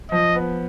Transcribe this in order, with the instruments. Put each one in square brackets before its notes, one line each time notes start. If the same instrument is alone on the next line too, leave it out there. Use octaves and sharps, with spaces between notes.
[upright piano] F3 [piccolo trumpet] D#5
[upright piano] B3